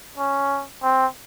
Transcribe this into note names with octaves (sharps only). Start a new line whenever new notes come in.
C#4
C4